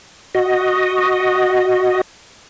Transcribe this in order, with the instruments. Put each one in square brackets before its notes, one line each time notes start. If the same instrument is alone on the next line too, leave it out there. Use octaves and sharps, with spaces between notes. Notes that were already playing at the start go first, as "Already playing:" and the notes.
[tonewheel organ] F#4 D#5